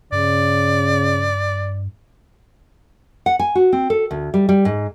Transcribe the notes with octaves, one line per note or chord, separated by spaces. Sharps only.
G2 C#3 D5
F#5
G#5
F#4
C4
A4
D2
G3
G3
G#2